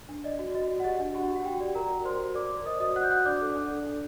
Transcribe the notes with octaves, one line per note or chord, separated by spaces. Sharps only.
D4
D5 D#5
F#4
F#4 D#5
F#4
F#5
G4 D#5
D4
F#4 G4 F#5
G4
F#5
F#4 G4 G5
D5
A#4 A#5
F#4
C5 D5 C6
F#4
A#4 D5 D6
D5
C5 D#5 D#6
F#4 D#5 D#6
F#4 F#5 F#6
G6
F#4 F#5 F#6
D4 D5 D6
A4
D4
A4
D4